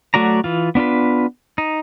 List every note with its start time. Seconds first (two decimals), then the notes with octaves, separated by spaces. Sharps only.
0.14 F#3 A3 F#4 D5 A#5
0.44 E3 F4
0.75 B3 D4 F4 B4
1.58 D#4